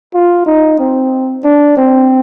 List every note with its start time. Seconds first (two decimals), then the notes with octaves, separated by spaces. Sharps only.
0.14 F4
0.46 D#4
0.79 C4
1.44 D4
1.77 C4